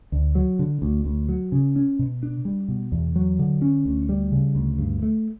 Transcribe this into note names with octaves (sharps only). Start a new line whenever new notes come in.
D2
F#3
D3
D2
D2
F#3
C#3
C#4
B2
D4
G3
B2
E2
F#3
D3
C#4
D2
G3
C#3
D2
G2
A3